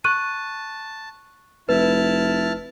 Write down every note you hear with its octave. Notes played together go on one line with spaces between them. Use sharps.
A5 C#6 F#6 D#7
F1 E4 B4 A5 F6